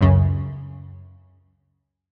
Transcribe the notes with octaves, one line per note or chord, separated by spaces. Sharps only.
C#2 F#2 C#3